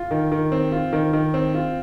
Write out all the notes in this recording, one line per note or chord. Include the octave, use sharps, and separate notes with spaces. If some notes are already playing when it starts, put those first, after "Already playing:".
Already playing: F4
D#3
D#3
C4
F4
D#3
D#3
C4
F4